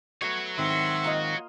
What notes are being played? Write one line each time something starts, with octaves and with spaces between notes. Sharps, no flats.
F#3 A3 B3 F#4 C#5
G#2 D#3 C4 E5 C6
A#3 F4 D#5